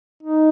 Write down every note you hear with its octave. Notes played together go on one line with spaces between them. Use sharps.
D#4